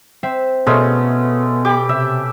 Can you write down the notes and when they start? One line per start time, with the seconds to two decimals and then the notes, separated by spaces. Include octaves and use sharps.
0.23 C4 E5
0.66 B2 G#3 A3 B3 C#4
1.65 G4 B5 D6
1.89 C3 E5